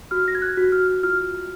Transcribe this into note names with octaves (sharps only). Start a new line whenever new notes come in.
F#4 F6
A#6
G#6
F#6
F#4
F6
F4 F6